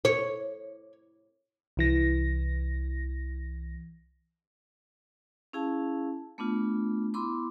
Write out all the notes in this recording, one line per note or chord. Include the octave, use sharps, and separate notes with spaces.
C#5
C2 E3 A#6
C#4 E4 G#4 F5 A5
A3 B3 D4 F4
B3 E4 B5 C6 D6